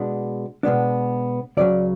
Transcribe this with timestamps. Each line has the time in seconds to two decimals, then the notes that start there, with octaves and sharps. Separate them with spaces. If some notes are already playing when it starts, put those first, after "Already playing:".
Already playing: B2 G#3 B3 D4
0.63 B2 G#3 B3 D4
1.57 C#2 C#3 F#3 C#4 D5